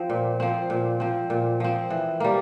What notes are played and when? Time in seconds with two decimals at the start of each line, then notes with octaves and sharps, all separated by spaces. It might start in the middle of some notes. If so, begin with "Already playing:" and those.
Already playing: F3 C4
0.10 A#2
0.40 F3 C4
0.70 A#2
1.00 F3 C4
1.30 A#2
1.60 F3 C4
1.90 E3
2.20 G3 A#3